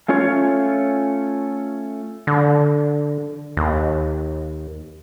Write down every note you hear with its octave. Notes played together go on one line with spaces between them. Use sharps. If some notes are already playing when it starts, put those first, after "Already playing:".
A3 C#4 F4 C#5
D3
D#2